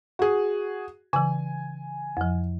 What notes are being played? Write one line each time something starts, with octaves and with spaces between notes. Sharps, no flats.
F#4 G#4
C#3 E3 G#5
F2 F3